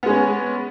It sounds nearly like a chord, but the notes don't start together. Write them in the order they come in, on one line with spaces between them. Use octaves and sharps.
B3 G#3 C#4